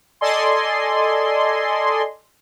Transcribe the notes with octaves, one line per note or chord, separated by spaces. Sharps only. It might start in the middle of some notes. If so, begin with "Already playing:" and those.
A4 D5 D#5 G#5 C6